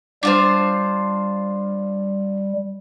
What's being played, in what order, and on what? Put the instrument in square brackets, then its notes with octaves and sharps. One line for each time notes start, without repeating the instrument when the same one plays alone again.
[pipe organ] G3 [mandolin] D4 F4 C5